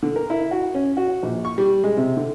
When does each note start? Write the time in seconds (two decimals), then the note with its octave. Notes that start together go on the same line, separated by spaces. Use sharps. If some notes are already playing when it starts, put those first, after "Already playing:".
0.03 D3
0.16 A#4
0.30 E4
0.51 F#4
0.74 C#4
0.97 F#4
1.23 A#1
1.45 C#6
1.58 G3
1.84 G#3
1.97 C3
2.17 D3